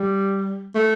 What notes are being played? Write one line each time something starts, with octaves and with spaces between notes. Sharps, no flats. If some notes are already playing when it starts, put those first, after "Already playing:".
Already playing: G3
A3